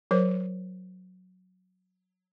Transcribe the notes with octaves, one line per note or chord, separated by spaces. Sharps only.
F#3 A#4 C5